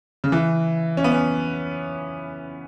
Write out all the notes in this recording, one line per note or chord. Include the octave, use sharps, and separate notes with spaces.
C#3
E3
C#4
B3
C#4